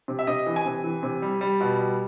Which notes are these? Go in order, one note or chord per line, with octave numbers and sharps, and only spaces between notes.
C3
E5
C3 D#5
E3
G#5
C3
E3
C3
G3
G3
B2
G3